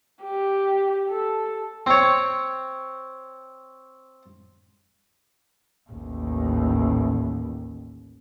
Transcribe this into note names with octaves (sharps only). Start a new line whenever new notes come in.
G4
A4
C4 C#5
A1 D#2